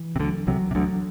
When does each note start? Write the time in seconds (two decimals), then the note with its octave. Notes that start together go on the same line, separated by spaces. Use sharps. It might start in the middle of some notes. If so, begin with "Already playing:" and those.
Already playing: E3
0.16 C3
0.20 D2 D3 F#3
0.47 C2 C3 F#3
0.71 C3
0.75 D2 D3 F#3